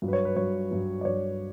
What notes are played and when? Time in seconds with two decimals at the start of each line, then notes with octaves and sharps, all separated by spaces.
0.02 G2 F#3
0.08 B4
0.13 C#5
0.25 B4
0.36 G2 F#3 C#5
0.71 G2 F#3
1.01 D5
1.05 G2 F#3 C#5